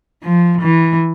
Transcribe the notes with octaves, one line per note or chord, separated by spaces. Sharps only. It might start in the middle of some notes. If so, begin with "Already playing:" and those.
F3
E3